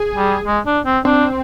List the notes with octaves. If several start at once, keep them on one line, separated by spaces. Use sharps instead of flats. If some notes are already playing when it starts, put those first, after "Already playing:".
Already playing: G#4
G3
G#3
D4
C4
C4 D4